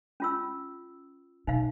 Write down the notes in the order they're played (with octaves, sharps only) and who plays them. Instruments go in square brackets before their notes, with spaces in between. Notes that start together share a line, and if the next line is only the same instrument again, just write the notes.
[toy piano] C#4 F4 E6
[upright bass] B2 [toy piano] D#4 F5